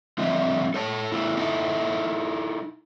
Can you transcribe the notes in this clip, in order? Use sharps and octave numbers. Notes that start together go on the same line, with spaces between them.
D3 F3 G3 C4 D#5 E5
A4 C#5 A5
A3 B3 E4
D#4 E4 A4